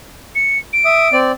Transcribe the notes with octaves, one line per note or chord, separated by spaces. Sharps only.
C#7
D7
E5 D#6
C4 D5